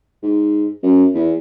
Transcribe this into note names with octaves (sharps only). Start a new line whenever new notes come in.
G#2
F#2
E2